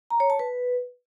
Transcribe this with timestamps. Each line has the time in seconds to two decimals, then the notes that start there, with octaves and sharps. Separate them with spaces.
0.10 A#5
0.20 C#5
0.30 A5
0.39 B4